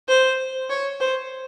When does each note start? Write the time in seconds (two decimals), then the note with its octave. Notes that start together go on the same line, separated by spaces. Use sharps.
0.09 C5
0.70 C#5
1.00 C5